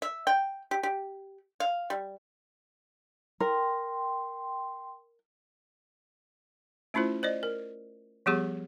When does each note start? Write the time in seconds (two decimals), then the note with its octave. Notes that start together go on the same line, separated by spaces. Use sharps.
0.02 E5
0.27 G5
0.71 G4
0.83 G4
1.60 F5
1.90 G3
3.41 A#4 G5 C6
6.94 A3 C#4 E4 F4 C5
7.23 C5 D5 D#5
7.43 A#4
8.26 F3 G3 B3 G4 G#4 C#5